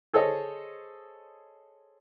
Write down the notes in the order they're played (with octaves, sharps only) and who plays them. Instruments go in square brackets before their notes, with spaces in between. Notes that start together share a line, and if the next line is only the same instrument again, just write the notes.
[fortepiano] G#4 A4 C5 C#5 D#5